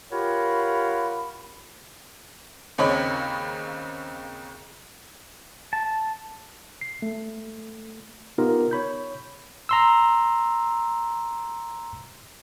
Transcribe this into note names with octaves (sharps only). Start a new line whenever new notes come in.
F4 G4 A#4 C#5 F#5 B5
D#2 C#3 C4 C#5 D#5 B5
A5
C7
A3
B3 D#4 F4 G4 A#4
C#5 B5 G6
A#5 C6 E6